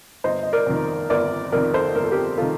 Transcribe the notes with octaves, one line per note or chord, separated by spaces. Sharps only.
G1 C5 D#5
D#5
A#4 D5
F2 D#3
G1 A#4 D5
F2 D#3 A#4 D5
A4 C5
G1 A#4
A4
G4 A#4
D#3 F4 A4